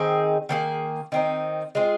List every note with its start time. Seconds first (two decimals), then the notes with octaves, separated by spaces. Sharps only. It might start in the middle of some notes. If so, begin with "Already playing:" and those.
Already playing: D#3 C4 D#4 G#4
0.49 D#3 A#3 G#4
1.12 D#3 C4 D#4
1.75 G#3 C4 F4 G#4